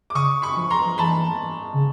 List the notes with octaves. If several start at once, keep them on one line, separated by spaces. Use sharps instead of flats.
D6
C#3 C#6 D#6
B5 C#6
F3
A#5 C6
F3
E3 A5 B5
C#3